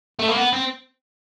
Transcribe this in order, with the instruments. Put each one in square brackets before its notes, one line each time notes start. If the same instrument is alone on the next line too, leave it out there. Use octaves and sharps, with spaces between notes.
[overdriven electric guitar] A3
A#3
B3
C4